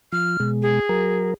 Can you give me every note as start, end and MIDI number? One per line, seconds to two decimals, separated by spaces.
0.12 0.37 53
0.12 0.50 89
0.40 0.80 47
0.40 0.80 56
0.62 1.31 68
0.89 1.34 54
0.89 1.34 70